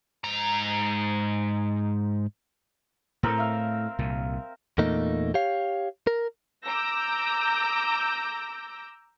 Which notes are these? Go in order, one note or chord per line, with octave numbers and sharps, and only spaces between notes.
G#2 A#5
A2 A3 C4 A#4
E5 F5
C2 A#2
E2 A#2 A3 A#3 D#4
G4 C#5 F5
A#4
A#5 D6 E6 G6 A#6